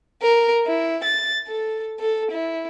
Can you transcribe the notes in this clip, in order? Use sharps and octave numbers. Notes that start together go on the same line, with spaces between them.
A#4
E4
A6
A4
A4
E4